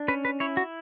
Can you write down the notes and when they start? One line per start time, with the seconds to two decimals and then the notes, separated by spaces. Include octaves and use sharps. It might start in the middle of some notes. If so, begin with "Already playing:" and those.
Already playing: D4
0.08 C#4 B4
0.25 B4
0.40 E4 C#5
0.57 F#4